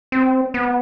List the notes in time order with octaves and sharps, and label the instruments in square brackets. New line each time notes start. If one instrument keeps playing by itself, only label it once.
[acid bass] C4
B3